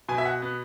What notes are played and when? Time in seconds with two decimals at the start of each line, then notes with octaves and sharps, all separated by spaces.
0.09 B2 G#5
0.18 E5
0.25 F#5
0.42 B3